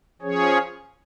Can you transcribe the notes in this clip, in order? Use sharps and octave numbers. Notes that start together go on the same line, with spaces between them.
F3 C#4 G#4 C#5